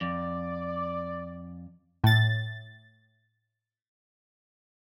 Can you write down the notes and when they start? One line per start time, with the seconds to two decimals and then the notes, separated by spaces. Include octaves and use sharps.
0.01 F2 D5
2.04 A2 A6